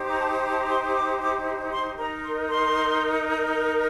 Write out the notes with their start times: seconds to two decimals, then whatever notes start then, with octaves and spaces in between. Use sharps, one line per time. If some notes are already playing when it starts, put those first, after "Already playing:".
Already playing: D#4 G4 C5
0.09 A#5
0.18 A5
0.44 A#5
0.52 A5
0.60 A#5
0.69 C6
0.94 D6
1.20 D6
1.72 C6
1.97 D#4 A#4 A#5
2.23 C6
2.49 C6